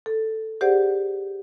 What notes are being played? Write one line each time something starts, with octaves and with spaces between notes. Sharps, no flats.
A4
G4 G#4 C5 D5 F#5